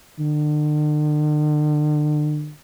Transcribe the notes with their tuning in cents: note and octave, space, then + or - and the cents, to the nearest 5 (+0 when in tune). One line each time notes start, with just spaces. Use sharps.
D3 +40